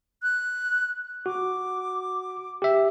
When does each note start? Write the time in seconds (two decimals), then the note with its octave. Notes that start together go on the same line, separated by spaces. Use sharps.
0.23 F#6
1.26 F#4 D6
2.62 G4 E5